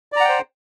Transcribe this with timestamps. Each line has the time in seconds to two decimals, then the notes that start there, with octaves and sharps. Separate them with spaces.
0.12 D5
0.16 A#5
0.20 F#5
0.24 G5
0.28 C5